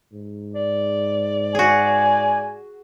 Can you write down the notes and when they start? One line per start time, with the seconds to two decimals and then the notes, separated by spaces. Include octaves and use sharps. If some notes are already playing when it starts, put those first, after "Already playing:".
0.13 G#2
0.55 D5
1.55 F#4 G#4 G#5